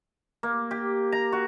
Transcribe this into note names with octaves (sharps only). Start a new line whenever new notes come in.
A#3
G4
A#5
F#4